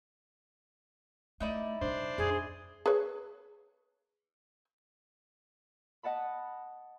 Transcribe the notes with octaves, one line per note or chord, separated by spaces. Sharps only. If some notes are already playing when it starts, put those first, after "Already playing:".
A3 D#4 E4 D5
C3 G3 D4 C5
F2 G#4
G#4 B4 C#5
D#5 F#5 A5 B5